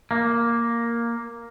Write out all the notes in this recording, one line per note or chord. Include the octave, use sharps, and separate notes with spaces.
A#3